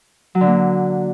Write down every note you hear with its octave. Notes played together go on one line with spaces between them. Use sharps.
F#3
D3
A#3